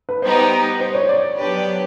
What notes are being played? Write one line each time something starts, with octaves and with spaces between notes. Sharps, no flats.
B4
G3 B3 D#4 G4 C5
C5
C#5
D5
F#3 B3 D4 G4 B4